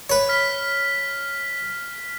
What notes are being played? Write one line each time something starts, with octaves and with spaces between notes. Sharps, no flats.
B4 C#5
F6 B6